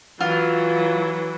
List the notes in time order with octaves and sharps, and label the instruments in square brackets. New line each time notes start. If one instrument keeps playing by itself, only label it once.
[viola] E3 F#3 [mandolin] F4